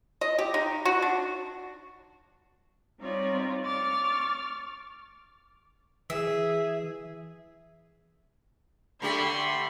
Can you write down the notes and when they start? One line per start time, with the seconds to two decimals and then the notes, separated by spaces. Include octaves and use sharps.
0.21 D#5
0.39 G4
0.54 D#4
0.85 F#4
1.02 D4
3.00 G3 C4 D#4 F4 C#5 D5
3.64 C#6 D6 F6 A6
6.10 E3 G#4 E5
9.02 D3 A3 G4 B5 C6 G#6